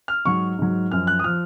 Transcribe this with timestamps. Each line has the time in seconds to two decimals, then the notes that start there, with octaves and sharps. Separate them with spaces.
0.08 F6
0.25 G#2 F#3 C#6
0.59 G#2 F#3
0.91 F#2 F3 F6
1.07 F#6
1.19 D#6
1.24 F3 F6